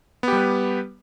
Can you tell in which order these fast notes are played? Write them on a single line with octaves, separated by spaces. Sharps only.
B3 G4 G3 B4